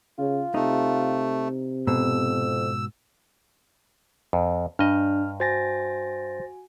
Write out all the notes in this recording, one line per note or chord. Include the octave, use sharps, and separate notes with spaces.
C#3 F4
C3 A3 D#4
F2 G#2 B2 E6
F2
G2 D4 D#5 F6
F#4 C5 G#5 A6 A#6